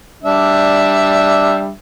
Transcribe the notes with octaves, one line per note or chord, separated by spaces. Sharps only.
G3 D4 E5